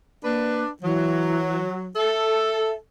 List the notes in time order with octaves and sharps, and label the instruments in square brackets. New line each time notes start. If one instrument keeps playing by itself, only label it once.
[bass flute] A#3 [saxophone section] D4 B4
[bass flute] E3 [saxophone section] F#3
[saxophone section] A4 [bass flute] E5